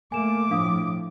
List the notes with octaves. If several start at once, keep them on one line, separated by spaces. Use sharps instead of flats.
A3 A#3 G#5 D6 E7
A2 F3 D4 F5 D#6